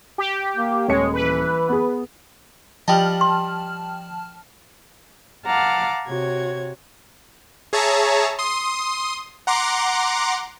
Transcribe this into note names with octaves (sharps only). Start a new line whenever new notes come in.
G4
A#3
D#1 G#3 C#5 C#7
E3 B4
B3 G#4
F3 G3 D#5 G5 A5 F6 F#7
C6
F5 F#5 A5 A#5 D6 F6
C3 F#4 C#5 G#6
G#4 C#5 E5 A5 A#5
C6 D#6
F#5 A#5 C6 D6